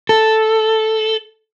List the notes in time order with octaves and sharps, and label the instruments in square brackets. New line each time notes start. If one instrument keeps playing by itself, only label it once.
[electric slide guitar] A4